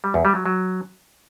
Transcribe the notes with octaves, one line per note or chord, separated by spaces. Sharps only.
G3
E2
G3
F#3
F#3